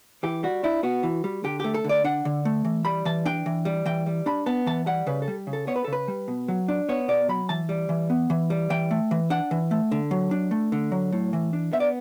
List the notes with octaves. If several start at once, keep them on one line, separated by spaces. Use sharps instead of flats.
E3 G4
G3 F#4
D4 E4
B3 F#4
E3
G3
D3 G4
A3 G4
A4
D3
D5
D4 F#5
D3
A3
E3
G3 B5
E3 A5
D4 G5
E3
G3
E3 G5
G3
D4 B5
B3 A5
E3 A5
G3 F#5
C#3 B4
A4
G3
C#3
A4
B3 C#5
B4
C#3 A4
B4
G3
B2
F#3
D4
B3 C#5
B2 D5
F#3 B5
E3 A5
G3
E3
B3
E3
G3
E3 G5
A3
E3
D4 F#5
E3
A3
D3
F#3
D4
A3
D3
F#3
A2
E3
D4
B3 E5
D5